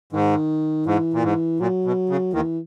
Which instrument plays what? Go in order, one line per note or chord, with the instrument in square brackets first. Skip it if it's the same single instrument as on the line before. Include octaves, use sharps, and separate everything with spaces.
[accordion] G#2 [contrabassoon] D#3
[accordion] G#2 [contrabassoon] E3
[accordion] A#2
G#2
[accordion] A#2 [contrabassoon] F#3
[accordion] B2
C#3
[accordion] D#2 D#3 [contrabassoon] E3